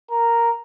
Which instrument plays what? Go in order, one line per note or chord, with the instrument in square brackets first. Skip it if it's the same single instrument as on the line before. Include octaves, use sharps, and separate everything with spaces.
[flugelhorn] A#4